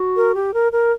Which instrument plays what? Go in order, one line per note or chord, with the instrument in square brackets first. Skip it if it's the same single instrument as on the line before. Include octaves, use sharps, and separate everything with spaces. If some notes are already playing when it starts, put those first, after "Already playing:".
Already playing: [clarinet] F#4
[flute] A#4
G4
A#4
A#4